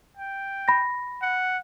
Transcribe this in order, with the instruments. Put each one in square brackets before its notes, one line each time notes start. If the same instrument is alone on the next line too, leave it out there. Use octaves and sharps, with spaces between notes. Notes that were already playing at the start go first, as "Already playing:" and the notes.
[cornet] G5
[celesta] B5 A#6
[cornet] F#5